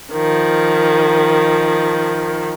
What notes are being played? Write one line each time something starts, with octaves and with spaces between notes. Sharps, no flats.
D#3 F3